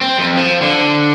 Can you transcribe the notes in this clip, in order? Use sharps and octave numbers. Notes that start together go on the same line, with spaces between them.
C4
F2
F3
D3